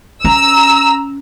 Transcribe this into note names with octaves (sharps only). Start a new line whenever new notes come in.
C#4 A#5 E6